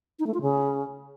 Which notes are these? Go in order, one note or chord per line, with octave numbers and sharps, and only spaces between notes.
D#4
A3
F4
C#3